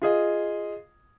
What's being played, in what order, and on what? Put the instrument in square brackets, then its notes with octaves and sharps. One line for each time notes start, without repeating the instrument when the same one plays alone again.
[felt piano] F4 G#4 D#5